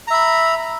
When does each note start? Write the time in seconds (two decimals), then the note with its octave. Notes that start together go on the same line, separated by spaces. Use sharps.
0.07 A#5
0.11 E5
0.14 B5